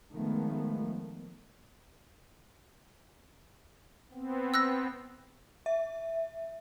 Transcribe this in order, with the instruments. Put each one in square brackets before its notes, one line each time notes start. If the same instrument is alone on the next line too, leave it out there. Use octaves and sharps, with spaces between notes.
[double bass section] D#3 F3 G#3 A3 B3
[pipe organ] B3 C4
[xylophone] E6 F#6 A#6
[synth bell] E5